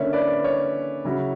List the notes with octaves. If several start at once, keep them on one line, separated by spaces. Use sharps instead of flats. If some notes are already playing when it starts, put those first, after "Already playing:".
Already playing: D3 A#3 C#4 E4 C#5 E5
B4 D5
C#5
C#3 F#3 C#4 E4